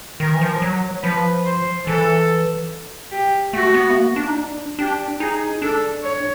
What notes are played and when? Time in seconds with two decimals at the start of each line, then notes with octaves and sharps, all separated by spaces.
0.20 D#3 A#4
0.34 E3
0.41 F3
0.62 F#3
1.03 F3 B4
1.45 C5
1.87 E3 A4
3.11 G4
3.53 A3 F#4
3.74 B3
3.90 A3
3.95 A#3
4.16 D4
4.28 D#4
4.36 D4
4.79 D4 G4
5.20 D#4 G#4
5.62 D4 A4
6.03 C#5